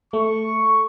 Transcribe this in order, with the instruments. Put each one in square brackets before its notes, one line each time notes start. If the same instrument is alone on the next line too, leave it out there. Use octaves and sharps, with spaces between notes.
[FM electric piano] A3 [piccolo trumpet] C#6